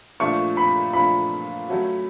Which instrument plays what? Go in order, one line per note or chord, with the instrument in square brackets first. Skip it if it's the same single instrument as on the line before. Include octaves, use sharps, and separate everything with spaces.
[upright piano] A#2 F3 A3 D4 F4 [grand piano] C#6
[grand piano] B5
[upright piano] A#2 F3 A3 D4 F4 [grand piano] B5
[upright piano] F#3 A3 C#4 F#4